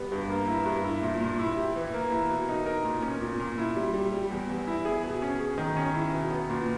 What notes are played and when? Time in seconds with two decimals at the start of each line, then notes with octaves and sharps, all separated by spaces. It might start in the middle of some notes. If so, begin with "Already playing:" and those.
Already playing: G3 B3
0.12 G2
0.30 A#3
0.47 E4
0.66 G2
0.84 E4
1.02 A#2
1.20 A#2
1.39 E4
1.57 G4
1.76 E3
1.94 A#3
2.11 E4
2.29 B2
2.49 D#4
2.66 A#4
2.85 A#2
3.02 C#4
3.21 A#2
3.40 A#2
3.58 E4
3.76 G3
3.93 G3
4.12 G3
4.31 E2
4.49 E2
4.67 E4
4.85 G#4
5.03 B2
5.22 C#4
5.40 G#4
5.58 D#3
5.77 C#4
5.94 E4
6.13 B2
6.31 B3
6.50 A#2